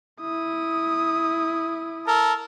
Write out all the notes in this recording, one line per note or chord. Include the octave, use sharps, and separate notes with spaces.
E4 D#6
A4 A#4